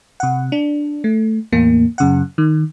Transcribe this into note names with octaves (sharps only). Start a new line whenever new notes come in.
C3 F#5
D4
A3
E2 A2 A#3
F#2 C#3 F#5
D#3